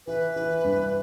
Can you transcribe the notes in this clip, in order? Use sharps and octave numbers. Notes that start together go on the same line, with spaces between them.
E3 B4
E3
G2